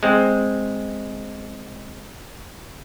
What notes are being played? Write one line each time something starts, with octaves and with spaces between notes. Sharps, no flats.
G#3 C4